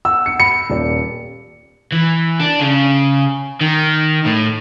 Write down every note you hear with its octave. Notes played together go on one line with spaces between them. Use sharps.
F#5 E6
C#7
B5 C#7
D#1 D5
E3
D4
C#3
D#3
A2